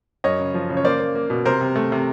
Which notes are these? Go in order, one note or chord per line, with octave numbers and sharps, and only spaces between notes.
F#2 C#5 D#5
C#3
F3
C#3
C#5
A#3 C5 D5
A#3
A#3
B2
C3 A#4 C5
C3
A3
C3